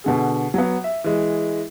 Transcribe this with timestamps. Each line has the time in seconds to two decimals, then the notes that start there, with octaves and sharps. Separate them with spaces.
0.04 B2 D3 G#4
0.54 F#3 B3
0.84 E5
1.04 E3 G#3